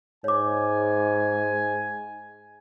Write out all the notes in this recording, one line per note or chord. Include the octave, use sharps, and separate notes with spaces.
G#2 C#5 G#5 D6